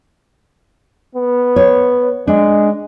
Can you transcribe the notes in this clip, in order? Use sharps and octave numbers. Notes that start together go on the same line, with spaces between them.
B3
C#5
G#3 D4